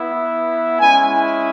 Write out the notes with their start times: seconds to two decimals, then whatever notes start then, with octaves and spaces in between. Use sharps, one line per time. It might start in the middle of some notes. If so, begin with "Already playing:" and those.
Already playing: B3 E4
0.79 G#3 C#4 E4 G#5